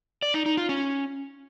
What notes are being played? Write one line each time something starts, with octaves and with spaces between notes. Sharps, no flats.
D5
D#4
D#4
F4
C#4